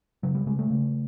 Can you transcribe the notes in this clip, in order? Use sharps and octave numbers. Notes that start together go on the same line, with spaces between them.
C#3 F#3
G3
C#3 G#3
A3
C#3